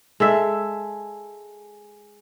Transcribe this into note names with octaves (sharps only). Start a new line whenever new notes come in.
G#3 A4 E5